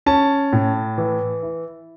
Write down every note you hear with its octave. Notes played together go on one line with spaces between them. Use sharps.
C#4 A5
A2
E3
E4